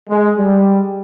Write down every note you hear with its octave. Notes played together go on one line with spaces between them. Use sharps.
G#3
G3